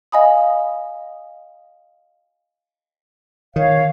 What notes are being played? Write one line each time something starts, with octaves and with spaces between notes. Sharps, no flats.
D#5 F5 G#5 B5 D#6
D#3 C#5 F5